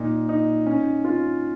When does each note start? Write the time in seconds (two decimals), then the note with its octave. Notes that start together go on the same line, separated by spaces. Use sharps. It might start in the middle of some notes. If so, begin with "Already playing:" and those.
Already playing: A#2 D#4
0.29 D#4
0.67 C#4
1.05 F4